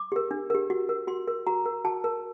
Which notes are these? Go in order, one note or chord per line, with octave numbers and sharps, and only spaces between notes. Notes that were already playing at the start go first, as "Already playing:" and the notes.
Already playing: D6
G4 A#4
D4
G4 A#4
F#4
A#4
F#4 C6
A#4
F#4 A#5
A#4
F#4 A5
A#4